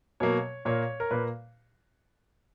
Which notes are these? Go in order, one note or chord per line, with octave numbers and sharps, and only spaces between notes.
B2 F#3 A#3 C#5
A#2 A#3 C#5
A#4
A#2 A#3 B4